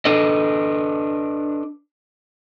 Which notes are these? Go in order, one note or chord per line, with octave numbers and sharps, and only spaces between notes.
D4 A4 B4 D#5